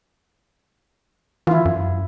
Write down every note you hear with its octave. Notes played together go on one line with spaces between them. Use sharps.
E3 E4 F4
F#2